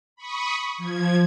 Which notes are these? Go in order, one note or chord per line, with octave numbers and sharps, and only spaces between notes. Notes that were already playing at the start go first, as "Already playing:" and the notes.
B5 C#6 D#6
F3 G#6